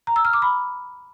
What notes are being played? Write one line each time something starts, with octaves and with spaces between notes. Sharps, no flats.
A#5
E6
F6
D6
B5